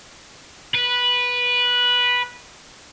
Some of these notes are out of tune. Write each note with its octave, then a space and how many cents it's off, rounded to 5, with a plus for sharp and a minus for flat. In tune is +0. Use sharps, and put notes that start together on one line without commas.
B4 -10